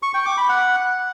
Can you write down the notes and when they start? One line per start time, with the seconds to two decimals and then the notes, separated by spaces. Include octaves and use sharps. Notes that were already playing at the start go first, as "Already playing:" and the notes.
0.03 C#6
0.14 G5
0.26 D6
0.37 B5
0.49 F#5